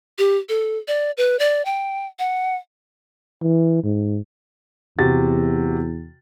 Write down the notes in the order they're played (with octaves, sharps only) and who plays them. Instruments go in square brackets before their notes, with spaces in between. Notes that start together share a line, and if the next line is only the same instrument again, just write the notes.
[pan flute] G4
A4
D5
B4
D5
G5
F#5
[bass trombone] E3
G#2
[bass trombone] E2 [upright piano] C3 F#4 A6